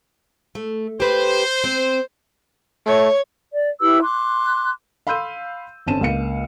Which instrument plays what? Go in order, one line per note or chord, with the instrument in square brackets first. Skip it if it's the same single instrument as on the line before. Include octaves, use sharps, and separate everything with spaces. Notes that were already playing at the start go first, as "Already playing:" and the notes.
[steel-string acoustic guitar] A3
[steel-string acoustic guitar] G4 B4 [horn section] C5
[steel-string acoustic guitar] C4
[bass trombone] A3 [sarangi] C#5
[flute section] D5
E4 G4 B4 E6
C6 D6 F#6
[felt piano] F5 B5 C6 E6 G6 D#7
G1 C4 C#4 A5 D#7 E7
C#2 A#3 F5 C#7